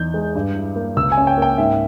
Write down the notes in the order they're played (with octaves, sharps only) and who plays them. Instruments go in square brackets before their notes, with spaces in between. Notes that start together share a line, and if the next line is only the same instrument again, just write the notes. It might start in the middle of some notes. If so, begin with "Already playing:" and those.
Already playing: [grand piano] E2 D#4 G6
G#3
G2
E4
A#3
C#2 E6
G#5
C#4
G5
A#3 G5
G#2 E5